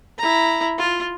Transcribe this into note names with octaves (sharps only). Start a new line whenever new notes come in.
E4 A#5
F4